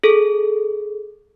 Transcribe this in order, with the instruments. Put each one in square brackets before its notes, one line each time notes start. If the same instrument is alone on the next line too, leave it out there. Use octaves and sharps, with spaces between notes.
[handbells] G#4 A4